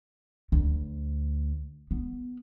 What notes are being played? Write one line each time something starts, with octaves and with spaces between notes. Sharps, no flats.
D2
B3